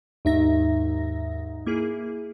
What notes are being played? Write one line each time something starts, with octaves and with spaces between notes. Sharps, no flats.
D#2 G#2 D#4 E5 A#6
A#3 E4 G#4